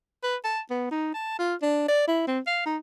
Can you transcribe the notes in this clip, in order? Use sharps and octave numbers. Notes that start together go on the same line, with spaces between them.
B4
A5
B3
D#4
A5
F4
D4
D5
E4
C4
F5
D#4